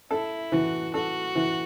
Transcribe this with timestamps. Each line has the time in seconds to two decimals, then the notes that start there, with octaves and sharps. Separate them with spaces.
0.11 E4 A4
0.52 E3 F#4
0.94 F#4 A4
1.35 E3